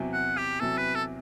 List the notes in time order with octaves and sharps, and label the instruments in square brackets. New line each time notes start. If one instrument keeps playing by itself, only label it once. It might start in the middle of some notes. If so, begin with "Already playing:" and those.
Already playing: [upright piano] E2 C3 F#3
[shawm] F#5
G4
[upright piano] E2 C3 F#3 [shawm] A4
[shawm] B4
A4